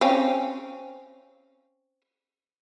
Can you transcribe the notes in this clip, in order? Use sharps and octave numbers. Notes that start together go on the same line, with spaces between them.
C4 C#4 F5